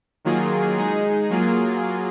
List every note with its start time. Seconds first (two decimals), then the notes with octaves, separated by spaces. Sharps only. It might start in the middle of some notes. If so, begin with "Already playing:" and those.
0.25 D#3 F#3 A#3 F4 G#4
0.77 G#3 D#4 G#4
1.30 F#3 A#3 F4 G#4